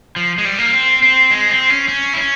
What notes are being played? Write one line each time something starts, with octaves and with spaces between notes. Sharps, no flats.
F3
G#3
G3
A#3
C4
C4
G#3
C4
C#4
C#4
E4
C#4